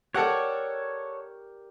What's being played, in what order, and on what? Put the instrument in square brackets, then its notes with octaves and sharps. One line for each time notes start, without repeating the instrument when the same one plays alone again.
[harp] G4 A#4 D5 [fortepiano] A4 F#5 F#6 [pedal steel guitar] C#5